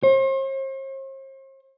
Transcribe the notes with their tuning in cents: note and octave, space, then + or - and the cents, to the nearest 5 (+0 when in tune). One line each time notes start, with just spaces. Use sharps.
C5 +45